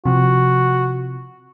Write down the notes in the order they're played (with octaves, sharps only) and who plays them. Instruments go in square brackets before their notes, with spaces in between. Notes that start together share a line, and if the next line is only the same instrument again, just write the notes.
[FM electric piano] C3 F3 [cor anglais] F#4